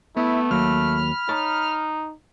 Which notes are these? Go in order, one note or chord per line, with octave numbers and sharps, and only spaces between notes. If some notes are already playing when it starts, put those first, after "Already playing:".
A3 B3 E4
D#2 F#3 A#3 B5 F6
D#4 C#5 A5